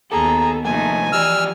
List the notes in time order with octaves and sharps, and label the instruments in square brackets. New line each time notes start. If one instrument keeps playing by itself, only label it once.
[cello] D#2 B3 [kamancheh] G#4 A#5 [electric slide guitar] A4
[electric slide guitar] C3 F3 A#3 [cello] A3 D#4 [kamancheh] G#5
[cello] E3 [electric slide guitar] F3 G4 D5 [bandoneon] E6 F6